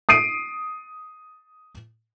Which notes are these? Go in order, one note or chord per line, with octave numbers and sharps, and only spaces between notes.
D#6 C7 D7 D#7